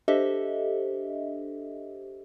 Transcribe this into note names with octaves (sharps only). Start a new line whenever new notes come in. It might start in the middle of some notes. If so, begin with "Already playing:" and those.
D4 G4 A4 C5 D#5 E5